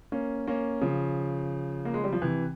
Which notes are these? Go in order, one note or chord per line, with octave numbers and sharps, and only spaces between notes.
A#3 C#4
A#3 C#4
C#3 F3
A#3
G#3
G3
F3
C3 E3